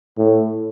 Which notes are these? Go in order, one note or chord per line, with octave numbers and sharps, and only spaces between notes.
A2